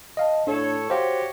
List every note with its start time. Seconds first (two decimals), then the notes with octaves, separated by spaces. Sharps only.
0.17 D#5 F5 A5
0.47 A2 D4 A4 C#5
0.90 F#4 G4 C5 C#5 F5